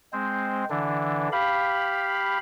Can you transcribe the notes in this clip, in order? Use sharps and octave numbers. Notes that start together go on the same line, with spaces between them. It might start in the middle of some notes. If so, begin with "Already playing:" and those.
G#3 C4 C5
D3 E3 D4
G4 F5 B5